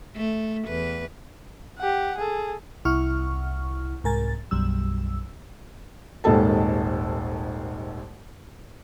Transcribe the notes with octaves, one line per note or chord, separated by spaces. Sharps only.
A3
E2 B4
G4 F#5
G#4 A4
C2 E4 F#5 C#6 F6
C2 G#2 A#4 G#5 A6
B1 F#2 G3 E6
D#1 G#1 D#2 G#3 A4 A5